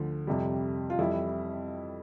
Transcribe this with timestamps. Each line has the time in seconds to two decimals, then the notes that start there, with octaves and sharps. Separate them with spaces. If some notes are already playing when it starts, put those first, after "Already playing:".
Already playing: D2 D3 F3
0.27 F2 C3 G3
0.90 F4
0.98 F2 E3 G3 E4